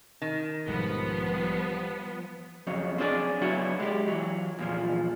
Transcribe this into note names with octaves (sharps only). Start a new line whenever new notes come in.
D#3
B1 G#2 F3 G3 B3
G3
F2 C#3 F#3
C4 D4 G#4 C5 D5
C#3 F#3 B3 E4 F#4 G#4
G#3 G4
E3 F#3
E2 A#2 F3